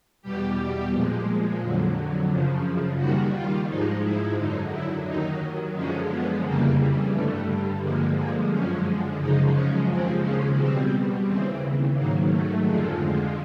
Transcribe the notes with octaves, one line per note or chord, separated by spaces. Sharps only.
E2 B2 G3 G4
A#2 F3 G#3
F2 D3 F#3
F#2 C#3 F3
D#2 D#3 G3 F#4
F4
G#2 F3 G#3 D#4
E4
F#2 D3 F#3 D#4
E4
D#2 D#3 F#3 D#4
F#2 D3 F3 G#3 C#4
B3
F2 C#3 E3 G3 A#3
G2 D3 G3 A3
G2 D3 F3 G#3 A#3
A#3
F#2 D3 F3 G#3 C#4
F#2 C#3 F3 G#3 D#4
C#4
D#2 C#3 F3 G#3 C4
C#4
B2 G3 C4
D#2 C#3 E3 C4
G#2 D#3 F#3 A#3
A3
F2 D3 F3 G#3